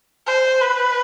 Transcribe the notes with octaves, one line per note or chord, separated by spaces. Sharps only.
C5
B4